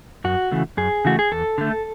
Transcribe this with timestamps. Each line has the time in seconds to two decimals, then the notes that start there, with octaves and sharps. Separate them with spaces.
0.24 F#2 F#4
0.52 C#3 E3 A3
0.77 F#2 G#4
1.05 C#3 E3 A3 F#4
1.19 G#4
1.32 E2 A4
1.58 D3 A3